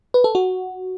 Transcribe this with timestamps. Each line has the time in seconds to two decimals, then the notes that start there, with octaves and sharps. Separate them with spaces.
0.14 B4
0.24 A4
0.35 F#4